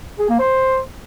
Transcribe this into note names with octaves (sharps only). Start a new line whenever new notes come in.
G#4
A#3
C5